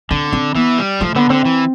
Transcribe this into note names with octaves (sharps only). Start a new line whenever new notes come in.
D3 C4
C4
E3 B3
G3
F3 A3
D3 B3
D3 C4
E3